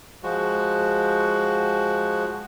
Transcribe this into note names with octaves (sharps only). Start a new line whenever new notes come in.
F3 G#3 F#4